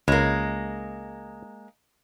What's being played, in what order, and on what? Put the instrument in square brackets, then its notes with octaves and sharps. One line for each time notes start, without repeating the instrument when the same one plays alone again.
[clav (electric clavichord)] C#2 [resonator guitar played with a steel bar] G#3 A#3